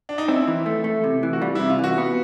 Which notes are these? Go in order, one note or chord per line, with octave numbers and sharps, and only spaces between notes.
D4
D#4
C4 E4
E3
A3
A3
C3
E3
F#4
G3 F4
C3 E4
F4
E3 F#4
B3